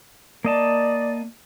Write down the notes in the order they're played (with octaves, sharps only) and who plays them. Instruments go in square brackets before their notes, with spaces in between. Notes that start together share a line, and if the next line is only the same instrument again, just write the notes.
[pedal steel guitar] A#3 D#5 A5 [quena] D5